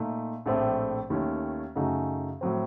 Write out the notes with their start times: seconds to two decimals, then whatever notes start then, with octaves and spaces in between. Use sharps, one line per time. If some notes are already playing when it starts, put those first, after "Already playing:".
Already playing: A#2 A3 D#4
0.46 A#1 A2 A3 C4
1.10 D#2 D#3 A3 C#4
1.75 F#2 C#3 A3 D#4 F#4
2.41 A2 F#3 C4